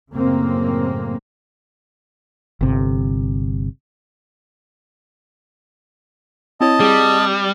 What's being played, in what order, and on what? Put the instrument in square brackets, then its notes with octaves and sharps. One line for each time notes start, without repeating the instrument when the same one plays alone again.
[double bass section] F#2 A2 C#3 A#3 C4
[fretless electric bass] G1 C3
[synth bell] C4 E4 C#5 [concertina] D#5 A5
[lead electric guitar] G3 [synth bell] C4 G#4